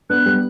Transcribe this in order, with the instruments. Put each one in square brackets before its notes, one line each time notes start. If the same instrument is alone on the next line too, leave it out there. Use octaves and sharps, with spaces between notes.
[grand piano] B3 D4 [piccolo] F#6
[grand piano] G3 B3